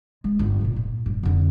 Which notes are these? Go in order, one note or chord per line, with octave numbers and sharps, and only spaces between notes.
G#3
G1 F4
A#2 E3
A#2
G2
F2 D3